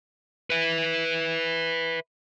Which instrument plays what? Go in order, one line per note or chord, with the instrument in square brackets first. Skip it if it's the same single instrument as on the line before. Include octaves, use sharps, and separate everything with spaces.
[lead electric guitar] B4 E5